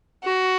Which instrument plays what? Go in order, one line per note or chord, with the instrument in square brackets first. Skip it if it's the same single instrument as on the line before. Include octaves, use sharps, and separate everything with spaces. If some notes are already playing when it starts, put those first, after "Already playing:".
[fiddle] F#4